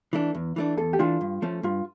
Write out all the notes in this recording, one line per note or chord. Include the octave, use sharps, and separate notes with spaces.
E3 A3 D4
E2
E3 A3 D4
E2 A4
G4
E3 A3 D4 F4
G2
F3 A3 C#4
G2 F4